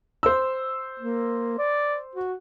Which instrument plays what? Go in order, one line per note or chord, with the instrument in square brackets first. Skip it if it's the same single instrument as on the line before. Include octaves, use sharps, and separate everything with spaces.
[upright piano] C5 E6
[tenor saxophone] A#3
D5
F#4